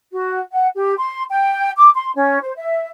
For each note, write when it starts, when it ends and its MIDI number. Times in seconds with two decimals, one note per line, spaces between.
0.12 0.39 66
0.52 0.67 78
0.75 0.92 67
0.98 1.23 84
1.30 1.70 79
1.76 1.88 86
1.94 2.10 84
2.15 2.37 61
2.41 2.52 72
2.55 2.88 76